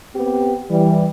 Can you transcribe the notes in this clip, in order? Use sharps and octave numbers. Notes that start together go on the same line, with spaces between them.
B3 C4 G4
E3 G3